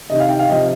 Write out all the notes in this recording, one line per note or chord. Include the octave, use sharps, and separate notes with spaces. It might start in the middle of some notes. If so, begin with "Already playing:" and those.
C3 D#3 D#5
F5
G5
F5
C3 F3 D#5